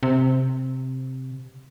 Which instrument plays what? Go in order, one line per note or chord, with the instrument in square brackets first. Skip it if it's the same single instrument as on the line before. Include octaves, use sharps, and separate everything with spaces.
[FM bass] C3